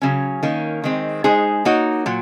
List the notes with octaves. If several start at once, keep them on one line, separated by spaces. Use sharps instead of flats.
C#3 F#3 C#4
D#3 A#3 C#4
D#3 G#3 C4
G#3 D#4 G#4 C5
A#3 D#4 F#4 C#5
A#2 F#3